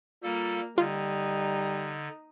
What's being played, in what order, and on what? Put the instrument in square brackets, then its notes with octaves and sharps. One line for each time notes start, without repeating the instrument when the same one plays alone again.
[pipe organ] G3 A4 [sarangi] A#3 [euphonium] F4
[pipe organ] D3 [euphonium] G3 [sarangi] D#4 [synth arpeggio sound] F4